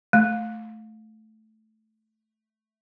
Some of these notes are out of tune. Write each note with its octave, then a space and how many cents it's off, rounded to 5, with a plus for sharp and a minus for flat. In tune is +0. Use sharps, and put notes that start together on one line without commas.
A3 -10